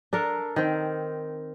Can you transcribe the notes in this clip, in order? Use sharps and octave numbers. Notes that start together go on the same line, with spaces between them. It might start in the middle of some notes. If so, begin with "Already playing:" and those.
D4 A4 A#4
D#3 C4